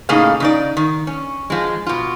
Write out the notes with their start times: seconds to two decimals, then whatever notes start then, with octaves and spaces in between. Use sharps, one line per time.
0.09 A2 C#3 A#3 D#4 G#4 F5
0.40 C#3 D#4 D5
0.77 D#3
1.07 C#4
1.50 F3 G#3
1.87 B2 F4